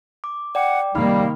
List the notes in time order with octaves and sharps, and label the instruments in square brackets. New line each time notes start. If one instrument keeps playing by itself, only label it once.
[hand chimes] D6
[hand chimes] D5 G5 D6 [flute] F#5
[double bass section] C3 D#3 A#3 [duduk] G3 [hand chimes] D#4 B5 F6 [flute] F5